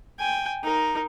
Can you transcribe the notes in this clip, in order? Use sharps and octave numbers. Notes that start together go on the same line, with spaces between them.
G5 G#5
D#4 A#4